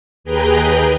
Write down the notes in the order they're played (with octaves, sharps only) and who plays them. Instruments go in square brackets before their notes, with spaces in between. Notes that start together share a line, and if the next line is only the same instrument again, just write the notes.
[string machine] D#2 G#4 B4 G5 A#5 G6